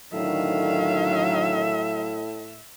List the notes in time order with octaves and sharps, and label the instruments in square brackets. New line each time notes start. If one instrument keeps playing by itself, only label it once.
[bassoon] A2 [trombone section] D3 D#3 [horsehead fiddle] F#3 F5 [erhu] E5